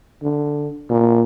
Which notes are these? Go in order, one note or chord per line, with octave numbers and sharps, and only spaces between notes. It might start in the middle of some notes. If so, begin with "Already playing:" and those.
D3
A#2